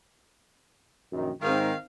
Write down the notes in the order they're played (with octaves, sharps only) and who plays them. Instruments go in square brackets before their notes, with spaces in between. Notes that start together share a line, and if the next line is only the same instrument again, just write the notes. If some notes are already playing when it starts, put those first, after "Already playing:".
[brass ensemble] A#1 F#2 D#3
[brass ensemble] G#2 [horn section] D#3 [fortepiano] C4 D#4 A#4 [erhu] F5